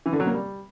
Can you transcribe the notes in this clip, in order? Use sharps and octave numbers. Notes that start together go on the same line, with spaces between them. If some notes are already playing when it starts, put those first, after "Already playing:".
E3
D3
F#3
A#3
G3